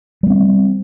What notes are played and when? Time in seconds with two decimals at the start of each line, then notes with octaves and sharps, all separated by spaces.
0.23 G3
0.27 A3
0.30 C4